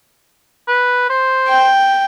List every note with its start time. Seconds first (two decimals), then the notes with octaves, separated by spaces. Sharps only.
0.68 B4
1.10 C5
1.49 G5